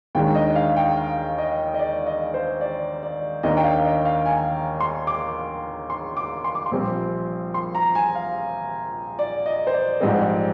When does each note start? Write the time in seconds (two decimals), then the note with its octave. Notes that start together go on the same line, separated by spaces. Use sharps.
0.15 D#2 D#3 G#3 D4 G5
0.35 D#5
0.55 F5
0.76 G5
0.97 F5
1.38 D#5
1.74 D#5
1.79 D5
2.07 D#5
2.34 C5
2.61 D5
3.03 D5
3.43 D#2 D#3 A#3 D4 D#5
3.57 G5
3.64 F5
3.84 D#5
4.05 F5
4.26 G#5
4.80 C6
5.07 D6
5.90 C6
6.17 D6
6.44 C6
6.55 D6
6.66 C6
6.71 A#1 A#2 G3 C4
7.54 C6
7.75 A#5
7.95 G#5
8.15 F5
9.19 D5
9.46 D#5
9.67 C5
9.74 D5
10.01 A#1 G#2 G3 C4 D#5
10.21 D5